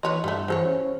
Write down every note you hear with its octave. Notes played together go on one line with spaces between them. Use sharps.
E3 B4 C#5 D#5 C6
G2 G3 A3
E3 F#3 G#4 A4 C5 C#5
C#4